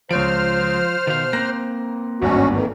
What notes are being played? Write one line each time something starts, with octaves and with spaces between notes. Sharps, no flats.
C#2 F3 C5 C#5 F6 D7
B2 D#3 F5
A#3 C4 F#6 A#6
G#1 E2 G2 B2 C#4 F#4
F2 D#3 E3